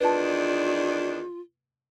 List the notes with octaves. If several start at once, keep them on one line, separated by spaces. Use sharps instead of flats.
E2 D#3 D4 F4 B4 A5